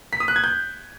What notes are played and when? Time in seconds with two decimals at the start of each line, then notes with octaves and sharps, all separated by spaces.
0.13 B6
0.20 D#6
0.28 F#6
0.36 G#6
0.44 G6